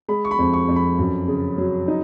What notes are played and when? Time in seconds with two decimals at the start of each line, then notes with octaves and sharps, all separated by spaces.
0.08 G#3 B5
0.25 C#6
0.31 B5
0.38 F2
0.53 C#6
0.68 F2
0.76 B5
0.99 F#2
1.28 C#3
1.58 F#3
1.88 D#4